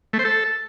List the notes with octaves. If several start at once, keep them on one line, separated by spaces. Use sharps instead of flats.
A3
C5
A4